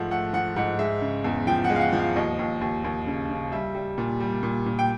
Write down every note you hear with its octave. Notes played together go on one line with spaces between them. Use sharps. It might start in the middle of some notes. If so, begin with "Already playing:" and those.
Already playing: G#2 F3 A3 F#5
A3 F#5
F3 F#5
G#2 F#5
G#3 E5
C#3
E2
F3 G5
F#5
G#3
F5
F#5
F3
F5
D#2 D#5
D#2
D#2
D#2
C#3
C#3
G3 E5
G3
A#2
G3
A#2
A#2
G5